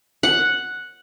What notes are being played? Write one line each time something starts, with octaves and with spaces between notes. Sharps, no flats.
F#5